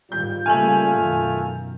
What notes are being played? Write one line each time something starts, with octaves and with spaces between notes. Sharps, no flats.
G#2 D#3 G3 F4 G6
C#3 G3 A3 A#3 G#5 F6 F#7
F#2 B2 D#3